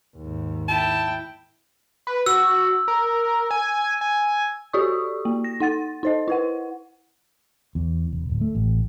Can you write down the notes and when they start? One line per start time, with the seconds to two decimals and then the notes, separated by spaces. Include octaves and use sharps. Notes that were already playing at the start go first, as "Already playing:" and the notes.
0.17 D#2 G#2
0.68 E4 G5 A5
2.07 B4
2.26 F#4 E6
2.88 A#4
3.51 G#5
4.01 G#5
4.73 F#4 G4 A4 D5 C#6 D#6
5.25 A#3
5.44 A#6
5.60 D#4 F#5 A6
6.03 D#4 C5 D#5
6.28 E4 B4 F#5
7.75 E2
8.12 E1
8.29 D1
8.41 A3
8.55 A1